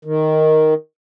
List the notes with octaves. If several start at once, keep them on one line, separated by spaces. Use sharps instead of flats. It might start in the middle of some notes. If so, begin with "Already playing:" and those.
D#3